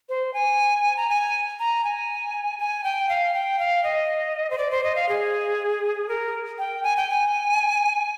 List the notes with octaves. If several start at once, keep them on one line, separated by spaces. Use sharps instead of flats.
C5
G#5
A#5
G#5
A#5
G#5
G#5
G5
F5
G5
F5
D#5
C5
D5
C5
D#5
F5
G#4
A#4
G5
G#5
G5
G#5